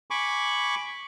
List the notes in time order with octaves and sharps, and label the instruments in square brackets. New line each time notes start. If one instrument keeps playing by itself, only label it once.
[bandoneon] G#5 B5 C#6 D6